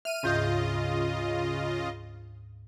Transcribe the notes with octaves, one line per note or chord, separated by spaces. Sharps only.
E5 F6 D#7
D2 G#2 C#3 F4 D#5 G6